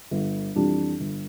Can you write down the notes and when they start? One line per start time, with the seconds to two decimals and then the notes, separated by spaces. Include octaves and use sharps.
0.11 G1
0.55 F2 E3 G3 D4
1.00 G1